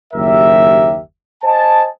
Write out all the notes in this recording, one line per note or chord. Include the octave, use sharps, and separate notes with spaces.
F#1 D#2 G4 A#4 E5
C5 D#5 G#5 A5